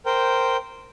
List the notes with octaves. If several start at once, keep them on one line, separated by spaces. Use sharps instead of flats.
A#4 C5 G5